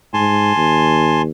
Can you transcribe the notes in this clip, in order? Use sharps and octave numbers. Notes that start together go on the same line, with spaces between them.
G#2 G#5 A5 C6
D#2